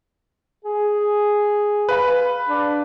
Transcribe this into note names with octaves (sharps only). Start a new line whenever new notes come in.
G#4
B4 F5 B5
D4